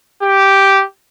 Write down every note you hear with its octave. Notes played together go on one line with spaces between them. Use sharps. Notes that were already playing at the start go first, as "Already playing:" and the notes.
G4